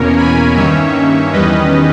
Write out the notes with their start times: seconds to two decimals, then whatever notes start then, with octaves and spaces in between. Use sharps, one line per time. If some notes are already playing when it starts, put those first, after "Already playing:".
Already playing: E2 B2 A#3 C#4 A#4 C#5
0.17 G#5 B5
0.56 G2 D#3 A#3 C#4 C#5 E5
1.33 E2 D#3 G3 C#4 B4 D#5